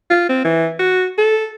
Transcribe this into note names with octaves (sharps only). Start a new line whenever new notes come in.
F4
C4
E3
F#4
A4